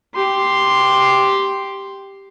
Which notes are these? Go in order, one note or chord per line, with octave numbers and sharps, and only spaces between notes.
G4 C6